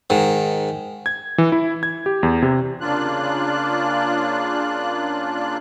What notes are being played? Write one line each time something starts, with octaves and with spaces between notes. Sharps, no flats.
G#2 D#3
G#6
E3
E4
G#6
G4
E2
C3
C#3 A#3 D4 F4 F#6